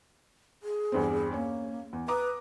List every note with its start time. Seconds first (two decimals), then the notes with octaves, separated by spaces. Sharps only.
0.63 G#4
0.92 E2 G2 C4
1.34 A#3 C#4
1.93 E2
2.08 B4 A#5 D6 D#6